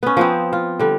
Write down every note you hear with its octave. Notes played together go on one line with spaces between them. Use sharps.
B3 C#4
F3 B3 C4
F4
D3 G3